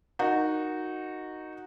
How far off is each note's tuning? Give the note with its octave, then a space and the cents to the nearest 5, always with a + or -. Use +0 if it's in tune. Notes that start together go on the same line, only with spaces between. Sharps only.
D#4 -5 F#4 -5 A#4 +0